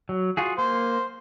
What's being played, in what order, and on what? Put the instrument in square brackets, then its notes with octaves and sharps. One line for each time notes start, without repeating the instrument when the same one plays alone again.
[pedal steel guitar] F#3
F4 F#4 G#4
[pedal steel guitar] A#3 [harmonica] C5